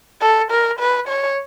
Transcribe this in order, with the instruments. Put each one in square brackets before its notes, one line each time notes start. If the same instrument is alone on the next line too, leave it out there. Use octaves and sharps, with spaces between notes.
[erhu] A4
A#4
B4
C#5